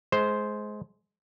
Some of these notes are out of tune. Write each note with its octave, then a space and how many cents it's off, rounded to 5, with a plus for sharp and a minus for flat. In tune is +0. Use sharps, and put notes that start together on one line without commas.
G#3 +25 C5 +0